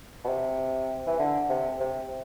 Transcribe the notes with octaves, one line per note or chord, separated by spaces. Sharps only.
B2
C3
E3
D3
C3
C3